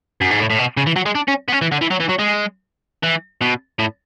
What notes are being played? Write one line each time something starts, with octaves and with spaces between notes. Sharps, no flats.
F#2
G#2
A2
A2
B2
C#3
E3
F#3
G#3
D4
C#4
B3
C#4
E3
D3
E3
F#3
E3
F#3
G#3
E3
B2
A2